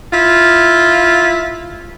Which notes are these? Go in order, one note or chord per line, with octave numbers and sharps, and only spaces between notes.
E4 F4